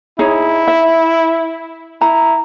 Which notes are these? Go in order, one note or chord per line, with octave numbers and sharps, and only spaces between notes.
D#4 E4 G#4 C#5
E5
E4 A#5